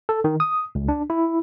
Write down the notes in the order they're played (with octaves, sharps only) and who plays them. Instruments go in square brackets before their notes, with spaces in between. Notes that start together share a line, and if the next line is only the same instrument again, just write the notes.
[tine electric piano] A4
D#3
D#6
C#2
D4
E4